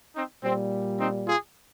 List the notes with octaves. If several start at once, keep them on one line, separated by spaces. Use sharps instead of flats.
C4 D#4
A#2 G3 C4
C4 D#4
F4 G#4